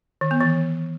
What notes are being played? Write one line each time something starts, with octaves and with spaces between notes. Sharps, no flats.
D#3
B3
E3